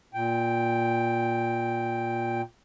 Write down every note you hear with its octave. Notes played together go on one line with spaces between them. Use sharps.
A#2 G5